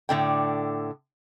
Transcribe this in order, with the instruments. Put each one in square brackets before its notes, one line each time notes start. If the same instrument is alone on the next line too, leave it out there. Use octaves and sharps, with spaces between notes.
[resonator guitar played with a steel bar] A2 D3 G5